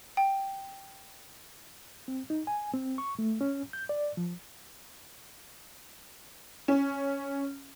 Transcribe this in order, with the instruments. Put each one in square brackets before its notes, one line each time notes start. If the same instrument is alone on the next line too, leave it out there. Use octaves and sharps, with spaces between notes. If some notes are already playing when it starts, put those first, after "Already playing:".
[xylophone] G5
[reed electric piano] C4
D#4
G#5
C4
C#6
A3
C#4
G6
D5
F3
[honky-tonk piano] C#4